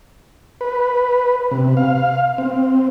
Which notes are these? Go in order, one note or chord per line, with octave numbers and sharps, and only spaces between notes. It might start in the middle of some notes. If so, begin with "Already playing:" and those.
B4
C3
F5
C4